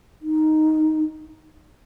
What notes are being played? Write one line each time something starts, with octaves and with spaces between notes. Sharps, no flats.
D#4